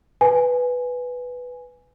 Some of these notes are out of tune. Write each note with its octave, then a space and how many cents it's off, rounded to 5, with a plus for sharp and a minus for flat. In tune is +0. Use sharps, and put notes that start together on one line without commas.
B4 +0 G#5 +0